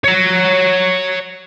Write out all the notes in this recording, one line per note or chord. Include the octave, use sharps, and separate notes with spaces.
C#5 A#5